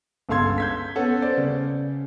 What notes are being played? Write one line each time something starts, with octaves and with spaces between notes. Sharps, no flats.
G1 C#2 A4 F5 C6 G#6
G6 G#6 B6
B3 C#4 A4 F#5
C5 D5
C#3